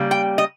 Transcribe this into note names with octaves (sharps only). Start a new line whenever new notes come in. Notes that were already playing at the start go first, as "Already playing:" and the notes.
Already playing: C#3 G3 A#3
G5
D#5